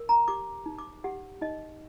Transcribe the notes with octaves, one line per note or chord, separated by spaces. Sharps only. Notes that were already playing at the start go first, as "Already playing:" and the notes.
Already playing: A#4
A#5
G4 D6
D#4
D6
G4 F#5
D#4 D#5